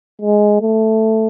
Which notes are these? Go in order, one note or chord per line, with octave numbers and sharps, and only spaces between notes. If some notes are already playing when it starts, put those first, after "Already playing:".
G#3
A3